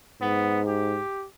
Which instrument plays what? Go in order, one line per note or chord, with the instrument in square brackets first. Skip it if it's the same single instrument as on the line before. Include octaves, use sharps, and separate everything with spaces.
[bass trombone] G#2 [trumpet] B3
[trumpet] G4